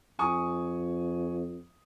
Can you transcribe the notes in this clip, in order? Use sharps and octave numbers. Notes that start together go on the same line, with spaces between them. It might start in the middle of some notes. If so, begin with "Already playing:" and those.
F2 G#5 C#6 D#6